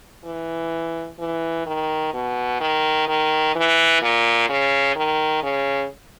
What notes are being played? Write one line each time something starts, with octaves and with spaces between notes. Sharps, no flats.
E3
E3
D#3
B2
D#3
D#3
E3
A#2
C#3
D#3
C#3